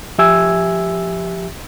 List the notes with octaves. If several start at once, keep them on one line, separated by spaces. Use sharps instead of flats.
F3 G4 E5 G#5 E6 G#6